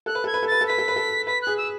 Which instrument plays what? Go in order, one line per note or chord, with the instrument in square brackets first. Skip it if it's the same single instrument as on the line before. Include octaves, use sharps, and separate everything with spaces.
[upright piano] A4 [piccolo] F#6
[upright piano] B4
[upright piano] A4 [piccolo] G#6
[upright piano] B4
A4
[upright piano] B4 [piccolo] A6
[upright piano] A4
[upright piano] B4 [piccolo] B6
[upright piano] A4
B4
A4
[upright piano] B4 [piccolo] B6
[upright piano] G#4 [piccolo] F#6
[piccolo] E6